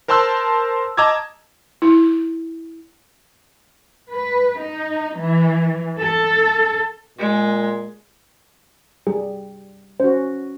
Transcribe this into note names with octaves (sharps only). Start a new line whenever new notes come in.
A#4 C5 A5 C6 E6 F#6
D#5 A5 A#5 D6 E6 G#6
E4
B4
D#4
E3
A4
A#2 G#3
G3 G#4
C#4 F#4 C5